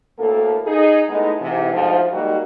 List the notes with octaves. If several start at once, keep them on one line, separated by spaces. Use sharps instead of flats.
D2 A2 A#3 A4
D#4 G#4
G#3 A3 B3 D#4 E4
G#2 C3 E3
D2 G#2 F3
G3 G#3 A#3 D#4 F#4